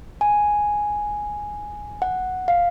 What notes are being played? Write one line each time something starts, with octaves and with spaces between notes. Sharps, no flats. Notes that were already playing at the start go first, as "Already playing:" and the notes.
G#5
F#5
F5